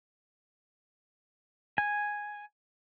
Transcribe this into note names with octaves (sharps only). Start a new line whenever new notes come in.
G#5